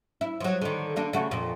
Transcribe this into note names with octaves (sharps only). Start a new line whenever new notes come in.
E4
F3 F#3
D3 D#3
D3 A#3 D4
C#3 A3 F#4
F2 A#2